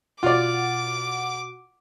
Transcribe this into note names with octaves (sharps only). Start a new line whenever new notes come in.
B2 F4 F#4 D5 F#5 D6